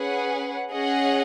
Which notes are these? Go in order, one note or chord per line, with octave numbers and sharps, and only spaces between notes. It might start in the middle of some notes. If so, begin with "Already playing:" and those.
Already playing: C#4 G#4 B4 F#5
C#4 G#4 D#5 F#5